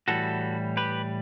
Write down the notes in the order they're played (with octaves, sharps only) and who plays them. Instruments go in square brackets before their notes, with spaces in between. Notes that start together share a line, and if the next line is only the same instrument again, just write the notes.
[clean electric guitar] A2 E3 G3 F#4 A4
G4 B4